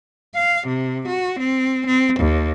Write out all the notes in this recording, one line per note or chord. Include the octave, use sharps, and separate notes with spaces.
F5
C3
F#4
C4
C4
D#2